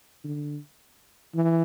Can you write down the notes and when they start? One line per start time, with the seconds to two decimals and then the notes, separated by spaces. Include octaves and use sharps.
0.24 D3
1.34 E3